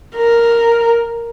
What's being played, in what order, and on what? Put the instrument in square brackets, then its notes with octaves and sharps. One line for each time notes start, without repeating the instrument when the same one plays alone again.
[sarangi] A#4